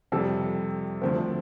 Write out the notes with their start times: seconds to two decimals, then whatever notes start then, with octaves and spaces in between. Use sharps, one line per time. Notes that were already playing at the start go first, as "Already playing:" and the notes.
0.12 F2 C3 G3 A4
1.02 D2 D3 F3 A3 C4